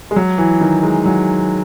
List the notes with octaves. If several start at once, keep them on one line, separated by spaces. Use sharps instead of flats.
G#3
F#3
E3
D#3
G#3
F#3